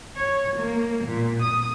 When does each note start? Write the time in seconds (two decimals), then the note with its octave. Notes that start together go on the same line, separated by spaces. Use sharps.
0.16 C#5
0.56 A#3
1.05 A#2
1.42 D#6